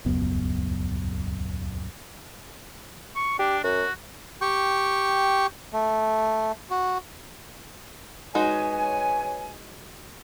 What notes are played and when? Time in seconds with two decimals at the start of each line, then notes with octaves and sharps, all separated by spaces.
0.05 D#1 C#2 F#2 B3
3.16 C#6
3.39 D4 G4
3.64 F#2 F#4
4.42 G4 G5 C#6
5.73 A3
6.70 F#4
8.35 G#3 D#4 F#4 B4 C#5 G#5